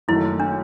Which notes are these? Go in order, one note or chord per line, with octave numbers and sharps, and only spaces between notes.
F#1 F#2 D#3 F#3 A3 E4
D4